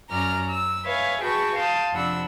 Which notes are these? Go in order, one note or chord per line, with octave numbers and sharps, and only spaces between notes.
F#2 C#4 F#4 D5 A#5 F6
E6
B4 C#5 E5 F5 G#5
F#4 G#4 B4 G5 A5 C#6
F5 G5 A5 C6 D#6
F2 C3 D4 F#5 B5 E6